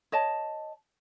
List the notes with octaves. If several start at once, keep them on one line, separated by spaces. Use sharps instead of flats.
C#5 D#5 A5